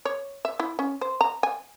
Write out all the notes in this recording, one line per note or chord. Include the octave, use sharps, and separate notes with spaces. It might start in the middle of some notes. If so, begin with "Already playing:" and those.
C#5
E5
E4
C#4
C5
A#5
G#5